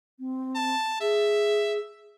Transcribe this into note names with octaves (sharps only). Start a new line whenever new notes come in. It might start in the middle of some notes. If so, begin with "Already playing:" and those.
C4
A5
G#4 E5